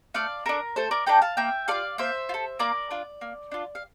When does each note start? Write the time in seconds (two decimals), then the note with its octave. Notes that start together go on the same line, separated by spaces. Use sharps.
0.14 A3 D5 F5
0.46 D4 A4 A#4
0.76 A3 A4 C5
0.91 A#4 D5
1.07 D4 A4 G5 A#5
1.21 F5 A5
1.37 A#3 E5 G5
1.68 F4 A4 D5 F5
1.98 A#3 C5 E5
2.29 F4
2.34 A4
2.59 A#3 A#4 D5
2.91 D4 F4
3.21 A#3
3.52 D4 F4
3.75 F5